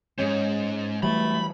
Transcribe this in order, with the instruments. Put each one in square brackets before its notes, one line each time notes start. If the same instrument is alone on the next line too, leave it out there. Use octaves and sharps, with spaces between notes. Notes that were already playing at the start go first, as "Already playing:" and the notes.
[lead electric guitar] G#2 [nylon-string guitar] G#3 C#4
[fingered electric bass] E3 F#3 G3 [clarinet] A3 [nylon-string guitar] B3 [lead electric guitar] B5